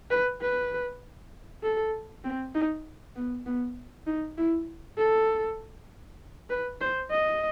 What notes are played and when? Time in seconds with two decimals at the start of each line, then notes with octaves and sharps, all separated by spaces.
0.11 B4
0.42 B4
1.63 A4
2.24 C4
2.55 D#4
3.16 B3
3.46 B3
4.07 D#4
4.38 E4
4.98 A4
6.50 B4
6.81 C5
7.11 D#5